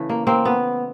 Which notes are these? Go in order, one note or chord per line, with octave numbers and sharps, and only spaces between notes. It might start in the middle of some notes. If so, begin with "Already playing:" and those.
Already playing: C#3 E3 A3
A#3
A#3 C4
B3